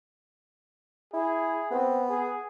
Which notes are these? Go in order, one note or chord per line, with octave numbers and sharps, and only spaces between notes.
E4 G#4
B3 C4
G#4